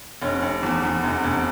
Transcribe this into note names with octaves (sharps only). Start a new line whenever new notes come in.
F1 C#4
F1
E2
E2
F1
F1